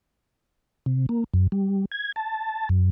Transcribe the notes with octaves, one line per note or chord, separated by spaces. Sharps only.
C3
A#3
F#2
G3
G#6
A5
F#2